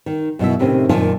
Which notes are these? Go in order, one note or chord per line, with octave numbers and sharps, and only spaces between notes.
D#3
F#2 B2 E4 E5
A2 C3 D#3 C4 C#4
F#2 A#2 D#3 F4 A5